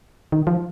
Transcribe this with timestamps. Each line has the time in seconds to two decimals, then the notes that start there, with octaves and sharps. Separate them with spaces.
0.32 D#3
0.47 F3